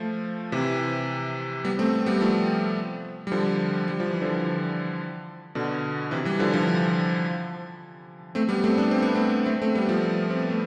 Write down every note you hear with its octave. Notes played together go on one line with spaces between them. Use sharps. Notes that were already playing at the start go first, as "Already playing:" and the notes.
Already playing: F3 A3
C3 E3
G3 B3
A3 C4
G3 B3
F3 A3
G3
D3 F3
G3
F3
E3
D3 F3
B2 D3
C3 E3
E3 G3
D3 F3
D3 F3
A3 C4
G3 B3
A3 C4
B3 D4
C4
B3
A3 C4
A3 C4
A3 C4
G3 B3
F3 A3
C4
B3
A3